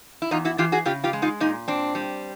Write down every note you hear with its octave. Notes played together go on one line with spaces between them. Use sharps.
E4
E2 D#4 F4
E4 F#4
E3 F4 G4
F#4 G#4
C#3 F4 G4
F4 G4
G#3
D#4 F4
A#2 D#4
C4 D4
G3